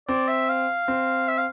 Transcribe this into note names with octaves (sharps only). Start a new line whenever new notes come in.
C4 D5
E5
F5
C4
E5
F5